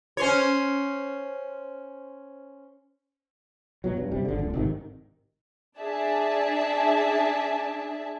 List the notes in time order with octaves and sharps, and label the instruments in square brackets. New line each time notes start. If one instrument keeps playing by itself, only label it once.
[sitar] C#4 C5 C#5
[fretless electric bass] B2 F#3
G2
C3 G3
G#1 D3
D1 C#2 D3
G#1 C3 D#3
[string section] D4 G#4 D5 E5 A5